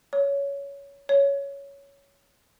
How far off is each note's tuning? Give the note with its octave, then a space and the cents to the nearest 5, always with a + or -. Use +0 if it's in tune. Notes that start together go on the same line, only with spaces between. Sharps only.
C#5 +15
C#5 +10